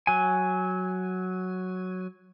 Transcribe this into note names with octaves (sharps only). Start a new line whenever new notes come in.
F#3 G#5